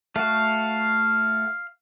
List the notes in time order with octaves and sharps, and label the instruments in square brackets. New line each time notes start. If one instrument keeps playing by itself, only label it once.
[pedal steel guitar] A3 F#4 [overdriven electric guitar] F5